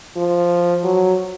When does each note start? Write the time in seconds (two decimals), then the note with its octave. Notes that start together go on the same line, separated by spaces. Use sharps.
0.17 F3
0.84 F#3